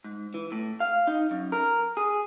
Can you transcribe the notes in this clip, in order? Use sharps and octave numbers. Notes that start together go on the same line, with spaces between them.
G#2
E3
A2
F5
D#4
F#2
A#4
G#4